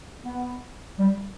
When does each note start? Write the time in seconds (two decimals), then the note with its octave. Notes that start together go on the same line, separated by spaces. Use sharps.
0.22 B3
0.99 G3